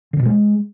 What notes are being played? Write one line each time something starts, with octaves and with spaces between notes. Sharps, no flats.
D3
B2
G#3